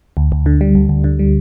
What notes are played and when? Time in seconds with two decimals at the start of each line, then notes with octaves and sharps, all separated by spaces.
0.17 D2
0.32 D2
0.46 D3
0.61 G3
0.75 D2
0.89 D2
1.04 D3
1.19 G3